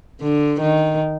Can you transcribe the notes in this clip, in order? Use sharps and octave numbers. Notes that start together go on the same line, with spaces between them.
D3
D#3